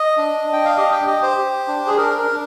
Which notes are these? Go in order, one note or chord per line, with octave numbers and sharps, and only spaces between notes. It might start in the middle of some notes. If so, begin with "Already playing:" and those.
Already playing: D#5
D4
D4
G5
F5
G4 D#5
G5
G4 D#5
C5
G4
D4
G#4
D4 A#4
A#4
D4